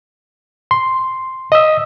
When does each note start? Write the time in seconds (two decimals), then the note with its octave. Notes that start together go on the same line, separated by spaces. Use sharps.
0.71 C6
1.52 D#5 D#6 E6